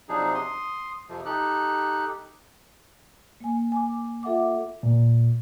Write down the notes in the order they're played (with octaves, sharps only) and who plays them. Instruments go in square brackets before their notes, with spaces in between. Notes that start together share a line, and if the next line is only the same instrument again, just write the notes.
[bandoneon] C3 F3 F#3 D4 D#4 G#4
C6 D#6
F2 C3 F3
D#4 G4 A4 F#6
[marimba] A#3 G#5
G#5 D6
F4 A4 E5 F#5 D6
[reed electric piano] A#2